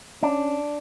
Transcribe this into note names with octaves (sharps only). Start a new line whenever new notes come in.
C#4 D4